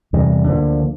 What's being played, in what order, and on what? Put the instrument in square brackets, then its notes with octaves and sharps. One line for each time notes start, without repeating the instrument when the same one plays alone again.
[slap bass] E2 C3 G3
D2 D3 F3 A#3